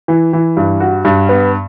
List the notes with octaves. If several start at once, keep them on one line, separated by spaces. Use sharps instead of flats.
E3
E3
G2
F#4
G2
B3